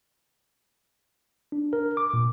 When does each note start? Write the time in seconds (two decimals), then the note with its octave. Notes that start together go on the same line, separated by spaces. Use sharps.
1.52 D4
1.73 A#4
1.97 D6
2.14 A#2